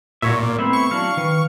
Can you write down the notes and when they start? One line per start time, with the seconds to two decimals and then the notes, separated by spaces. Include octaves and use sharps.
0.22 A#2 F#4 C#5 E5
0.36 A#3
0.59 A3 B3 C4 E4 C5 E5
0.73 C#6
0.91 F#3 D4 E4 F5
1.17 D#3 B4